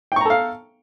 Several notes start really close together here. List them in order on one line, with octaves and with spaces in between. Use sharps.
G5 C#6 A#5 A4 F5